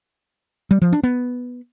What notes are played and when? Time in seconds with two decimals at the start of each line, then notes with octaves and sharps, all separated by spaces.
0.71 G3
0.82 F3
0.93 D4
1.03 B3